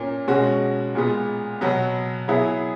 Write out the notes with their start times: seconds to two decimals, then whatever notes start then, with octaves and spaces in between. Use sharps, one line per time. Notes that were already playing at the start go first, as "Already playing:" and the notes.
Already playing: A#2 A#3 C#4
0.28 B2 G#3 C#4 F#4
0.95 A#2 G#3 B3
1.61 B2 F#3 B3
2.28 F#3 B3 E4 G#4